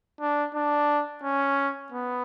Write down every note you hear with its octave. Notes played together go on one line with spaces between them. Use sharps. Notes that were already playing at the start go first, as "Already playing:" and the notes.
D4
D4
C#4
B3